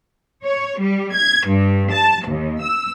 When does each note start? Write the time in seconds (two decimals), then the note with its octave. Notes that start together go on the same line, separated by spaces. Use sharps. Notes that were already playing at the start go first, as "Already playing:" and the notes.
0.45 C#5
0.81 G3
1.14 G#6
1.47 G2
1.92 A5
2.27 D#2
2.62 E6